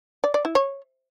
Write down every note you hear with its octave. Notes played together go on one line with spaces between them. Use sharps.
D5
D5
E4
C#5